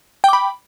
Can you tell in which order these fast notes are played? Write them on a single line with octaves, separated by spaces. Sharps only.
G5 D6 B5